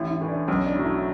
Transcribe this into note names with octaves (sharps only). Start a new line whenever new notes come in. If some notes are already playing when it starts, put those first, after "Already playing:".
Already playing: A1 E4
E4
A2 E3
D4
B1 C#4
D4
A2 F#3
E4